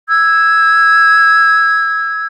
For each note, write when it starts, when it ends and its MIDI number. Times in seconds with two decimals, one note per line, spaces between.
0.09 2.26 88
0.09 2.26 92